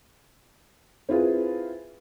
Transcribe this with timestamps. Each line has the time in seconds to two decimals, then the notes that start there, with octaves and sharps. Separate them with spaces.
1.09 C4 E4 F4 G#4 B4